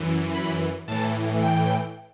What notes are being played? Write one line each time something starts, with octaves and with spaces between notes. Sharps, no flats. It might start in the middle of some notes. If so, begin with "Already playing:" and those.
Already playing: F#2 E3
B5
A2 E3 A5
G5